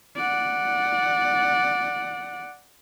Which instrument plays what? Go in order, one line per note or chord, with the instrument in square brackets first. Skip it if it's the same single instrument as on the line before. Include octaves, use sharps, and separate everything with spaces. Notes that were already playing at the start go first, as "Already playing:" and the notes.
[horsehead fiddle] D5 F#5